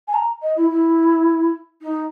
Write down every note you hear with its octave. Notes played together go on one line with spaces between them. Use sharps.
G#5
A#5
D#5
E4
E4
D#4